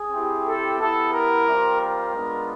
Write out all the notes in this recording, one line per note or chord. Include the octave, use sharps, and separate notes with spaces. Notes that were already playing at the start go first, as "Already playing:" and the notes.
Already playing: G#4
C4 E4 G4
A4
B3 E4 G4 A4
A#4
G3 C4 F4
A#4
G#3 B3 D4 F4